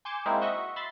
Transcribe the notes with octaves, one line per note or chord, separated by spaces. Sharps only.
G#5 C6 D6 G6 C#7 E7
G#3 A#3 C4 D#4 E4
F#4 D#5 E5 C#6
E5 B5 C6 A6